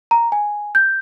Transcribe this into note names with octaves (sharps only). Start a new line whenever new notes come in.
A#5
G#5
G6